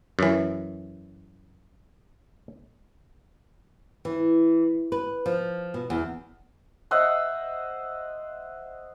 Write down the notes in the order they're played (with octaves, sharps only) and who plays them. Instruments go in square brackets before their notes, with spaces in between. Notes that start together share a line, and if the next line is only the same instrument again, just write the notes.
[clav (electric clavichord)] F#2 E3
[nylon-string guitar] E3
B4
F3
B2
E2
[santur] C5 D#5 E5 F#5